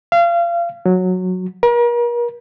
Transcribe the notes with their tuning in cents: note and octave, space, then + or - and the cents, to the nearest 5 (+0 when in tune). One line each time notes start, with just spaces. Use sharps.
F5 -30
F#3 -10
A#4 +40